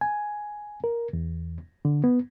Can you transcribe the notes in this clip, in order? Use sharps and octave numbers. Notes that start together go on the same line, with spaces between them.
G#5
A#4
E2
D3
B3